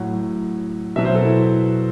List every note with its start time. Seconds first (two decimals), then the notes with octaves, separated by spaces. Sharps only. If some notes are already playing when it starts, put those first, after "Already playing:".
Already playing: A2 F#3 F#5
0.96 B2 F#3 E5
1.05 C5
1.15 A4
1.25 E4